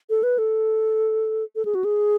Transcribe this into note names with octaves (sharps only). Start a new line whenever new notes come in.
A4
B4
A4
A4
G#4
F#4
G#4